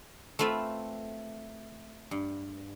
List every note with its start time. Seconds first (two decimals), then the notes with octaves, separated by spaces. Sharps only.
0.39 A3 C4 F4 B4 E5
2.11 G2